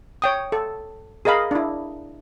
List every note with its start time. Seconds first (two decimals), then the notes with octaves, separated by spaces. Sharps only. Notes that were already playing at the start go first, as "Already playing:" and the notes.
0.22 C#5 G5 D#6
0.52 A4
1.25 G#4 A#4 D#5 F5 B5
1.51 D4 E4